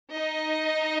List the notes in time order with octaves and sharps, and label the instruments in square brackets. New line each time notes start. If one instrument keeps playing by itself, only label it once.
[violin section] D#4 D#5